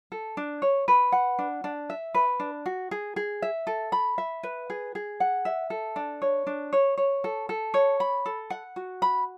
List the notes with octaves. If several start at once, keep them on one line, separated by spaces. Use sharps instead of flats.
A4
D4
C#5
B4
F#5
D4
D4
E5
B4
D4
F#4
G#4
G#4
E5
A4
B5
E5
B4
G#4
G#4
F#5
E5
A4
D4
C#5
D4
C#5
C#5
A4
A4
C#5
B5
A4
F#5
F#4
B5